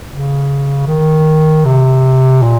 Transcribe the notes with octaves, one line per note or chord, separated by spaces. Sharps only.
C#3
D#3
C3
A#2